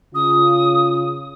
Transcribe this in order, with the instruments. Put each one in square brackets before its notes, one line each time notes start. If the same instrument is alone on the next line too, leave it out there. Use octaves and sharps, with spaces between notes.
[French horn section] C#3 F4 [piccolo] D#6